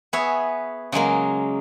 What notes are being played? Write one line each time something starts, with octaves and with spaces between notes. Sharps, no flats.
B3 G#4 B4 C#5 E5
C#3 F#3 G#3 A#3